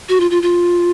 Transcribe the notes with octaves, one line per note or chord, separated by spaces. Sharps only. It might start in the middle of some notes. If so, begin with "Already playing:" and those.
F#4
F4
F4
F4